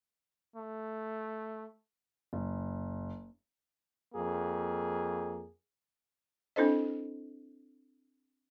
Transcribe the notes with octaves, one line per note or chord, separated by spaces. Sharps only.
A3
F#1
F2 A#3 G#4
C4 D4 E4 A4 C5 D#5